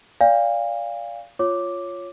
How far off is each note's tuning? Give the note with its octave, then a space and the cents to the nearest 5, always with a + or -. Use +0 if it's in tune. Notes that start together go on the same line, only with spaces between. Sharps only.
D5 -25 F5 +0 G#5 -45
F4 +0 C#5 +0 D6 +0